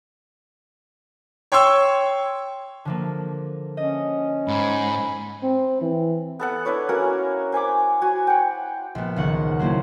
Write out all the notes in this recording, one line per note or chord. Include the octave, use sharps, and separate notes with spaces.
C#5 G5 C6 C#6 E6
D3 F3 A#3
C#4 D#5
G#2 G#5 B5
C4
E3
B3 A4 F#5
D4 E4 B4 C#5
A#3 C#4 F#4 A#4
C5 G#5 B5 D6
F#4 G#5
F#5 G5
A#1 B3
C#2 D#3 F#5 C#6
F#3 A#3 C4 C#4 E4